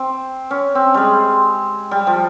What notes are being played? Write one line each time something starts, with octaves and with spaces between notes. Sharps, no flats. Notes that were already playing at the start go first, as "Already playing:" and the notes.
Already playing: C4
C#4
C4
G3 G#3
G3
F3